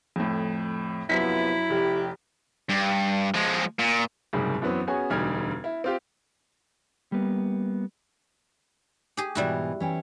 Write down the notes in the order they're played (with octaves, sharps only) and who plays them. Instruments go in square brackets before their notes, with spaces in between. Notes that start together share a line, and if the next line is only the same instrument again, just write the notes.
[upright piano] F2 A2
[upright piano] F#2 B6 [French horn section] C3 F3 B3 [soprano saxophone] E4
[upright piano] F1 [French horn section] G4
[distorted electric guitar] G2
F3 G#3
A#2
[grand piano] F#1 C2 G#2 F#3 G3 G#4
F#2 E3 F#3 B3 C4
B3 C#4 F#4 G#4 C#5 G#5
E1 D2 G3 D#4 F6 G#6
E4
C4 F4 G4
[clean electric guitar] G3 A#3 B3
[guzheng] G4 G#4
[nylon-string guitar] G#2 B2 E3 [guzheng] G3 E4 F#4
[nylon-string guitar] E3 C#4 G5